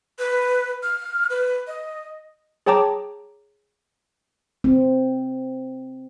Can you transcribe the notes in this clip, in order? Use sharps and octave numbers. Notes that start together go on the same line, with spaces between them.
B4
F6
B4
D#5
G#4 C#5 G5 A5 A#5 D6
C4